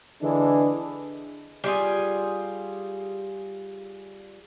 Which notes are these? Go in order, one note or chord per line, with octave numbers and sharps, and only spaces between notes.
D3 E3 G#3 D4
G3 F4 G#4